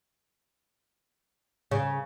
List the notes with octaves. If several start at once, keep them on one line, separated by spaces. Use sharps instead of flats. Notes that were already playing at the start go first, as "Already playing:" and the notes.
C#3